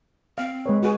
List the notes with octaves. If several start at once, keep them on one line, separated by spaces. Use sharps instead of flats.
C4 F5
G#3 B4 C#5
F#4 G#4 B4